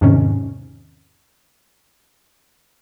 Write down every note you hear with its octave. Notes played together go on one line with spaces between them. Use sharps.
E2 G#2 C3 D#3 C#4